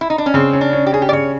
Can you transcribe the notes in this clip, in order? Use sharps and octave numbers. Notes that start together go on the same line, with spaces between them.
E4
D#4
D4
C#4
C#3 C4
C#4
D4
C#4
G4
C#4 G#4
G4
D5
C#3 C#5